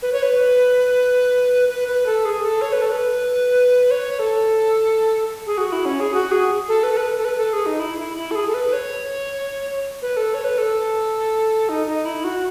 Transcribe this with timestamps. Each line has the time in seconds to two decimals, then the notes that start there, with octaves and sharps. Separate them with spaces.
0.02 B4
0.13 C#5
0.23 B4
1.69 B4
1.88 B4
2.06 A4
2.25 G#4
2.43 A4
2.62 C#5
2.72 B4
2.82 A4
2.92 B4
3.91 C#5
4.19 A4
5.47 G#4
5.58 F#4
5.72 E4
5.85 C#4
6.00 G#4
6.14 F#4
6.31 G#4
6.68 A4
6.83 B4
6.92 A4
6.97 B4
7.18 A4
7.25 B4
7.38 A4
7.53 G#4
7.66 D#4
7.80 E4
7.98 E4
8.18 E4
8.31 A4
8.36 G#4
8.47 A4
8.54 B4
8.73 C#5
10.02 B4
10.17 A4
10.34 C#5
10.44 B4
10.58 A4
11.69 D#4
11.87 D#4
12.05 E4
12.24 F#4